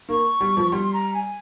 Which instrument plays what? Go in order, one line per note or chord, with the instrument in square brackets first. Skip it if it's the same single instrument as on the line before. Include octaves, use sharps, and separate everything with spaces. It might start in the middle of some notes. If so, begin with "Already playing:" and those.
[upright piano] A#3 [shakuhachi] C#6
[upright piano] G3
F3
[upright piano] G3 [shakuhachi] C6
[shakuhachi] A#5
G#5